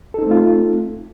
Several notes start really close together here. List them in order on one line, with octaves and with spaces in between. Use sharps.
A4 D#4 C4 A3 F4